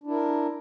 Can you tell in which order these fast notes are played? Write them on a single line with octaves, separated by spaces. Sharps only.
D4 E4 A#4